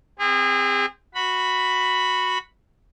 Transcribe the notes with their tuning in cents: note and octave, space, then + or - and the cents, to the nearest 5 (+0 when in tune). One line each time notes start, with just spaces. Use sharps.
C4 +0 G#4 -35
F#4 -10 B5 +0